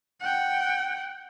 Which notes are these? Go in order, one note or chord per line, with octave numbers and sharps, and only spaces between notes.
F#5 G5